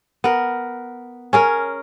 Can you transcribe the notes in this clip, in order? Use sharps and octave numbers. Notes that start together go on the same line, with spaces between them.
B3 A#4
C#4 G#4 A#4